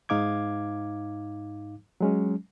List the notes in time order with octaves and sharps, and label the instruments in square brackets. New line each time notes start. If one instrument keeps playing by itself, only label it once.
[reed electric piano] G#2 D#4 F5 D6 G#6
F#3 G#3 C#4